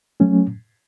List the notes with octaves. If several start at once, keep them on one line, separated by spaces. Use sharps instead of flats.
F#3 A3 C#4